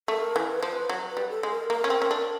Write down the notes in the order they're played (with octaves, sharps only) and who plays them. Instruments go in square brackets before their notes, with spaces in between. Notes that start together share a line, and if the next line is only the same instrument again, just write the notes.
[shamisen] A3 [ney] A#4
[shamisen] E3
[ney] B4
[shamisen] F3 [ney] C5
[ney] B4
[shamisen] F#3
[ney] B4
[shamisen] G3
[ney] A4
[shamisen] G#3
[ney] A#4
[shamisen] A#3 [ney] A#4
[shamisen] C#4
C4
C#4
D4